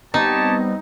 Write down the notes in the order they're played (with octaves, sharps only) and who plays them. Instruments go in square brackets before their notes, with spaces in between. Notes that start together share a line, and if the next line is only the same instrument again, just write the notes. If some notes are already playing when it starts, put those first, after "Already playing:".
[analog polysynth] G3 B3 C4 [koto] D#4 [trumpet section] G4 C#5 A5